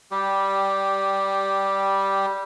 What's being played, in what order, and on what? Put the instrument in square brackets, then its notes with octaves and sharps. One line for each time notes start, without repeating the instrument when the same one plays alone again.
[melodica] G3 G4